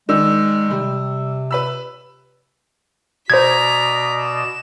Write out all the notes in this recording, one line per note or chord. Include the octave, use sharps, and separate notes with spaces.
D#3 G#3 D5 E6
C3 G3
B4 B5 E6
B2 C5 D5 D#5 A#5 G#6 B6
E7